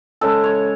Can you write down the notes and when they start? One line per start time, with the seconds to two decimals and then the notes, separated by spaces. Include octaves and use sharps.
0.21 C#3 G#3 A4
0.44 C#5